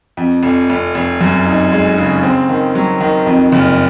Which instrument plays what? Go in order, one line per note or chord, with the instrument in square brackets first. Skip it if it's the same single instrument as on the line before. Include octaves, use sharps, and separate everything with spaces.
[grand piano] F2
F1
F1
F1
F#2
D#4
G#3
C#3
C4
D#3
F#3
D#3
F2
F#1